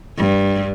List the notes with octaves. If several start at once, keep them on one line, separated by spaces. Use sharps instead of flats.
G2